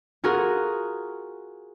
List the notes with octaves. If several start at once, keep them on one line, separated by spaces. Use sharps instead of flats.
F4 F#4 G#4 A#4